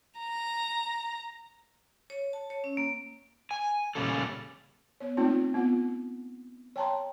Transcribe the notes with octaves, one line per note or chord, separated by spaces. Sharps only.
A#5
C#5
A5
C#5
C#4
A#3
G#5
A#2 C#3 G3 C#4 A4
B3 C#5
A3 A#3 C4 D#4 F4
B3 F4 F#5
C#5 G5 A5 A#5 C6